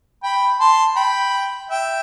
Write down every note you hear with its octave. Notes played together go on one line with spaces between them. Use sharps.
G5 B5
A5 C6
G5 B5
E5 G5